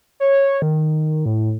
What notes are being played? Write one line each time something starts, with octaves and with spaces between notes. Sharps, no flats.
C#5
D#3
A2